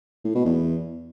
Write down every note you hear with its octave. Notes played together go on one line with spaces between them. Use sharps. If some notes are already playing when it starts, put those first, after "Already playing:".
A2
B2
E2